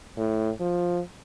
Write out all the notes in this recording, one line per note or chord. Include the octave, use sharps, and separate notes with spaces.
A2
F3